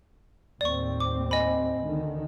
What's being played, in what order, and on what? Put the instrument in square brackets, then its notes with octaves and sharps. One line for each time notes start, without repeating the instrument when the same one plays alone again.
[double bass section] D#2 A2 C4 [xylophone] D5 C#6
[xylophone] D6
D#5 G#5 B5
[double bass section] D2 D3 D#3